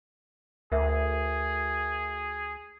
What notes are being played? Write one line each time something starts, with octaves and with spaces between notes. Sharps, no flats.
D2 G#4 A#4 E5